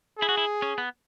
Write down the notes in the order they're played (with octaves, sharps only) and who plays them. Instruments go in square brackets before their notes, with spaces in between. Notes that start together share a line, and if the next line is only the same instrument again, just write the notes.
[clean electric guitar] E4 [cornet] G#4
[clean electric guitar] F#4
E4
C#4
B3